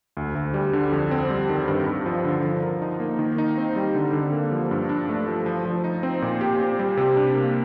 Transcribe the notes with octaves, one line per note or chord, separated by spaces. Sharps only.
D2
D2
G3
D3
F2
C4
G3
D#3
G2
G2
F3
D3
F3
A#4
D#4
A#3
D#3
D#4
C4
G3
D3
D3
A#3
F3
G2
D4
A3
F3
F3
F3
D#4
C4
A#2
G4
C4
G3
C3
D4
A#3